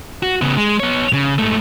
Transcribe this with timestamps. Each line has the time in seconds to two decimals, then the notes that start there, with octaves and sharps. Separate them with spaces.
0.23 F#4
0.42 C#3 B3
0.57 G#3
0.80 B3 C#5
1.13 C#3
1.38 G#2 A3